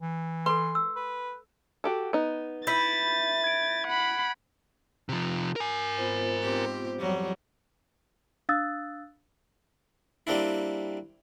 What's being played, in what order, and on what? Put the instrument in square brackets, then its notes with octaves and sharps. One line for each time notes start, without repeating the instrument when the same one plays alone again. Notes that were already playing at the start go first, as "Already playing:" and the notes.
[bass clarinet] E3
[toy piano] A4 B4 [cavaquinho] C6
[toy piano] E6
[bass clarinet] B4
[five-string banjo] F#4 G4 A4
B3 D#4
[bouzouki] E4 [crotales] G6 B6 D#7 [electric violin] A6
[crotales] G#6 D7
[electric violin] F#5 B5
[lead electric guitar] C3 F3
A#4 G#5
[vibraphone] B3 F4 C5
[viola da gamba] G#2 C4 G4
F2 F#3 G3
[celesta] D4 F5 D#6 E6 F#6 A6
[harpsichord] G3 A#3 C4 D4 E4